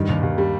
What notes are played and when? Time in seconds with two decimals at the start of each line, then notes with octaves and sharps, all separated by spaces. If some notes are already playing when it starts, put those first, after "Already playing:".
Already playing: G2 D#3 G3
0.09 D#2
0.23 D#2
0.38 G3